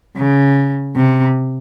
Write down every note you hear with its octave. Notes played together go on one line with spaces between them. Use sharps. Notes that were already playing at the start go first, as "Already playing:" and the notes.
C#3
C3